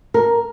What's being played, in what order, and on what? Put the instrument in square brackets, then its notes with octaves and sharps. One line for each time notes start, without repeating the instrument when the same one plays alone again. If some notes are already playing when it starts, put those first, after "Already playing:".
[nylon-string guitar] A#4